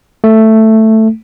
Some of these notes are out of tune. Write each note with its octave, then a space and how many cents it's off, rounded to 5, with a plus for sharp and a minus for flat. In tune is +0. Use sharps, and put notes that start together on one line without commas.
A3 +5